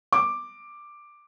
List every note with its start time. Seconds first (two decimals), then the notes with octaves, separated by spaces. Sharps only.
0.13 D6